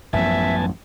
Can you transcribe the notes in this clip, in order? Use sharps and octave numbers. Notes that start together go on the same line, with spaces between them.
A1 F#2 F3 B3 E5 G#5 A5